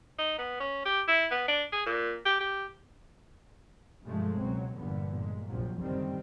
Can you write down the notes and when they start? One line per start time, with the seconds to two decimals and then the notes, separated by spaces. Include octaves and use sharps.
0.18 D#4
0.38 B3
0.60 C#4
0.85 G4
1.08 E4
1.31 B3
1.48 D4
1.73 G#4
1.86 A#2
2.25 G4
2.40 G4
4.05 G2 B2 F3 G#3 A3
4.37 C#2 B2 F#3 C4
4.77 G1 E2 G2 A#2 D3 B3
5.16 A#2 G#3
5.47 A#1 F2 C3 F3 F#3
5.78 F#1 D3 D#3 G3 C4